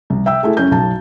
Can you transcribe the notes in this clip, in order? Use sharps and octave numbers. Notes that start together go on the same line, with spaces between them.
C2
E5 G5 E6
G#3 A3 E4
F#2 C#4 G6
B1 A5